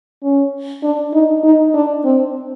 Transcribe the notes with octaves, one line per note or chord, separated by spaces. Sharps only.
C#4
D4
D#4
D#4
D4
C4